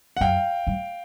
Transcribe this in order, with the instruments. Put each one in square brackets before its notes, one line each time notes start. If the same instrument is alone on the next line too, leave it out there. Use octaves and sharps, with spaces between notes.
[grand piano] F#5
[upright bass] F#2 [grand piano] F5 G5
[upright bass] G2